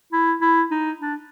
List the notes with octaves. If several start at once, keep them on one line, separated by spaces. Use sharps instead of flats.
E4
E4
D#4
D4